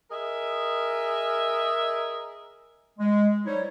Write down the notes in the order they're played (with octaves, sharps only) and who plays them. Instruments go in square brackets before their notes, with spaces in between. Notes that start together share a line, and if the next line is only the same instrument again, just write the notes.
[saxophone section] G#4 A#4 D#5 E5
[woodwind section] G#3
F#3 G3 D#4 E4 C5 C#5